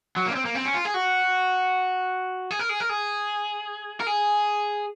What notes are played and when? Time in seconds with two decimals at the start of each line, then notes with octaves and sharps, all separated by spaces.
0.16 F#3
0.26 A#3
0.31 C#4
0.35 C4
0.45 A#3
0.55 C4
0.65 C#4
0.74 F4
0.85 G#4
0.94 F#4
2.51 G#4
2.59 A#4
2.69 G#4
2.80 A#4
2.89 G#4
4.00 A#4
4.07 G#4